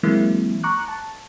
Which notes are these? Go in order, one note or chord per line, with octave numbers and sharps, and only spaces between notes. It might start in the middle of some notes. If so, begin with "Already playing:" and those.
E3 F#3 G#3 A#3 C4 E4
A#5 C#6 D6 F#6
A5